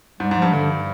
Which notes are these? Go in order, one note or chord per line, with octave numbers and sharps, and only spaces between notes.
G#2 G3
G#2
G2 F3
G2 D3